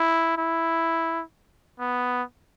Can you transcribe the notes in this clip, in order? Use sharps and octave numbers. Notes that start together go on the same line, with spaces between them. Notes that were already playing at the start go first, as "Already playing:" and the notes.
Already playing: E4
E4
B3